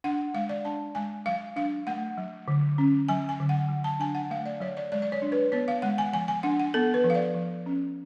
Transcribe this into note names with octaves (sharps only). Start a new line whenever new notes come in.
D4 F#5
G#3 F5
D5
D4 A5
G#3 G#5
F#3 F5
D4 F5
A3 F#5
F#3
D3
C#4
F#3 G#5
G#5
D3
F#5
F#3
A5
D4 G#5
F#5
A3 F5
D5
F#3 C#5
D5
G#3 D5
D5
C#5
D4
B4
B3 C#5
F5
G#3 F#5
G#5
F3 G#5
G#5
D4 F#5
F#5
B3 A4
B4
F3
F5
D5
F3
C#4